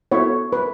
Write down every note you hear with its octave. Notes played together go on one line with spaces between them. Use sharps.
B3 E4 A4 C#5 E5
B4